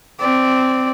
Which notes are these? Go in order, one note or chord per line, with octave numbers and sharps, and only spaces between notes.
C4 D5